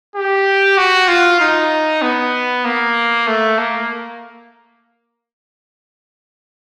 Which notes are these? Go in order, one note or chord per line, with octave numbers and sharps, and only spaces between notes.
G4
F#4
F4
D#4
B3
A#3
A3
A#3